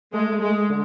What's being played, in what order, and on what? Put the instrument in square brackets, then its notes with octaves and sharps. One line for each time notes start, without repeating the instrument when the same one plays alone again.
[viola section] G#3 [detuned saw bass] A3
[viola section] G#3
[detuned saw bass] D3